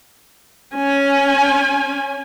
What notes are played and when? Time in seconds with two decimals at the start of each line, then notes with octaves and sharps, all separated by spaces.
0.75 C#4 G#5